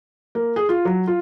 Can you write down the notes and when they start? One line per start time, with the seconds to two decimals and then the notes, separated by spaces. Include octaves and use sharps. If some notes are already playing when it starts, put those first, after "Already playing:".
0.35 A#3
0.56 G#4
0.69 F4
0.85 F#3
1.07 F4